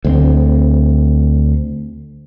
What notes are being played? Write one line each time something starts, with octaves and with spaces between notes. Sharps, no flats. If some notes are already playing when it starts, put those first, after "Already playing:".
D2 G#3 C4